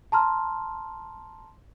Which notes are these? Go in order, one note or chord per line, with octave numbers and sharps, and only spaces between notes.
A5 A#5 C6 F6